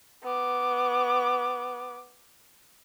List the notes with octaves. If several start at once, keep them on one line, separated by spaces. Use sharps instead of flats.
B3 D6